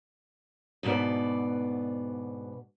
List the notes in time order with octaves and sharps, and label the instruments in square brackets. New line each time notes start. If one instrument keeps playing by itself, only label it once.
[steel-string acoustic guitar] D2 G#2 B2 B4 D5